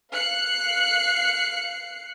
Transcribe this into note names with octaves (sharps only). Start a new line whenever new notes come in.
F5 F#6 C7 C#7